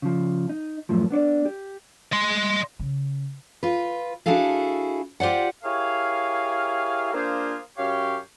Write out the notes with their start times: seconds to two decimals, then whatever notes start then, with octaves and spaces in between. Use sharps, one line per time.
0.02 C#3 F3
0.49 D#4
0.89 F#2 A2 F3
1.11 B3 D4 C#5 D5
1.45 G4
2.13 D#5 C6
2.79 C#3
3.63 F4 B4
4.26 D4 E4 F#4 G#4 A4 F5
5.20 F4 G4 C5 D5 F#5
5.64 E4 G4 G#4 A#4 C#5 F5
7.13 A#3 D4 F4 G#4 C5
7.77 F#2 G4 C#5 F5